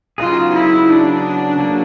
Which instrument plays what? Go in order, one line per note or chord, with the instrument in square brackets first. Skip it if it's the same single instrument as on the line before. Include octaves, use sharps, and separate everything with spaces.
[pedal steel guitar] C#3 F#3 B3 D#4 G#4 [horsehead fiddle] F4
[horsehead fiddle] E4
D4
[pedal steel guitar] C#3 F#3 A#3